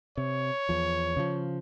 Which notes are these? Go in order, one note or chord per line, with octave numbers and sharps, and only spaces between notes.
C3 C#5
E2 F3
C#3 E3 F3